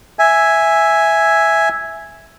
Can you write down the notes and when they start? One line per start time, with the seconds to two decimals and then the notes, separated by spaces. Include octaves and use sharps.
0.19 E5 G#5